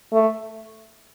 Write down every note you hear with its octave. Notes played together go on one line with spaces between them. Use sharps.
A3